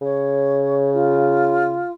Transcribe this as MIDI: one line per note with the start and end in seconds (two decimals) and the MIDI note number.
0.02 1.85 49
0.02 0.89 73
0.93 1.91 65